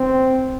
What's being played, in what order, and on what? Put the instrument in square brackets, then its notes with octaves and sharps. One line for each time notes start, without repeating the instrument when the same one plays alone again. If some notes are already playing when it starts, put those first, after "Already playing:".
Already playing: [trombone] C4